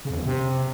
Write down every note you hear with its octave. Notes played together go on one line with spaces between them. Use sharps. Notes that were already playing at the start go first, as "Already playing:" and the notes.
C#3
F2
F#2
E2
C3